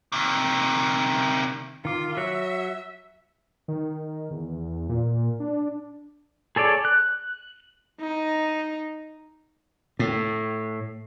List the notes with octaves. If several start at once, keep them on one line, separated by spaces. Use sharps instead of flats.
C3 D#3
D#3 F4 D6
F#3 F#4 C#5 E5
D#3
E2
A#2
D4
G#4 A4 C#5 D5
F#6
D#4
A2